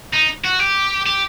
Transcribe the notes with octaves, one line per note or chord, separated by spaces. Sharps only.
D#4
F#4
G4
G4